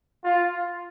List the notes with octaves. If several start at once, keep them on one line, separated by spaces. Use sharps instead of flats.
F4